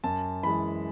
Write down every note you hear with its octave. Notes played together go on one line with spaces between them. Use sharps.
F#2 A5
E3 G#3 B5